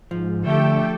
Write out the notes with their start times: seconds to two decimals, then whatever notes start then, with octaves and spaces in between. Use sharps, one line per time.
0.11 G#2 F3
0.45 D3 A3 G4 A4 G5